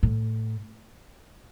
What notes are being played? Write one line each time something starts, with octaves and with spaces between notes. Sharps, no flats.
A2